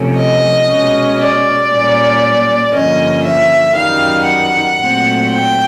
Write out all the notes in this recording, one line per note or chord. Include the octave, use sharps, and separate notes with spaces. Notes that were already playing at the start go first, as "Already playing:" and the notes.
Already playing: C3 F3 A3 C#4
D#5
B2 G#3 C#4
D5
A#2 G3 A#3 C#4
G2 D3 F3 A#3 C#4 D#5
E5
F#2 D#3 G3 F5
F#5
A#2 F#3 A3 C4
G5